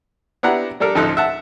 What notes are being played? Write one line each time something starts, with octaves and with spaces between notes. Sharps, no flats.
B3 D4 E4 G4 F#5 A#5
G3 D4 A4 A#4
A1 D2 F3 D#4 A4 F#6
E5 F#5 A5